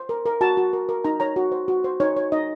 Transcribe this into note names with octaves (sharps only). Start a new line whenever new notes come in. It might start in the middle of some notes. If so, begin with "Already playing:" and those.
Already playing: C5
A#4
A#4
F#4 A5
F#4
A#4
A#4
D#4 A#5
C#5 A#5
F#4
C5
F#4
C5
D#4 C#5
C#5
D#4 D#5